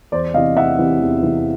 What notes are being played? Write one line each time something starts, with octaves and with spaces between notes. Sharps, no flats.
E2 C5 D5
C3 E3 D#5 F5
E2 E5 F#5
C3 E3
E2
C3 E3